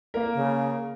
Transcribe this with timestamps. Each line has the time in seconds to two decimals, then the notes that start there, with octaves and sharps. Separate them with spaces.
0.14 A#3 A#4
0.35 C#3